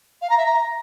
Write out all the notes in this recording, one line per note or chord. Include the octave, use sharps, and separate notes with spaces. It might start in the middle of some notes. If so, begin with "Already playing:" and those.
F5
A#5
E5
A#5